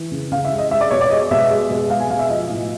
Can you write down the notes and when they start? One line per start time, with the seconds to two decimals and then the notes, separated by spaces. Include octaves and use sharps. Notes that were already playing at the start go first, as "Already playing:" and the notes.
Already playing: E3
0.12 C#3
0.32 C#3 F5
0.45 E5
0.51 G#3
0.58 D#5
0.71 G#3 E5
0.81 D5
0.91 B2 C#5
1.01 D5
1.10 G#3 D#5
1.31 B2 E5
1.50 G#3
1.71 B2
1.90 G#3 F5
1.99 G#5
2.10 B2 F5
2.19 E5
2.30 F3 D#5
2.49 A2